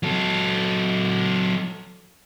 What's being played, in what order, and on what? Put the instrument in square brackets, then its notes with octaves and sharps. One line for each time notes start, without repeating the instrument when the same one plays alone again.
[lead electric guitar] F#3 A4